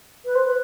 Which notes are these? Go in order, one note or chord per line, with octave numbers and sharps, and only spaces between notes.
B4
C5
B4